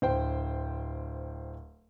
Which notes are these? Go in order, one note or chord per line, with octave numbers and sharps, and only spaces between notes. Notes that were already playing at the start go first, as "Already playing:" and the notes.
D1 C5 G5